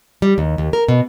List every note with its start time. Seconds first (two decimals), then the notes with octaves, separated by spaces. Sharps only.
0.22 G3
0.38 D#2
0.58 D#2
0.73 A#4
0.88 B2